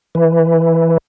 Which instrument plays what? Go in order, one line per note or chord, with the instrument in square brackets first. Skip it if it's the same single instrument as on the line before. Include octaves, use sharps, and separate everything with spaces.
[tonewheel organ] E3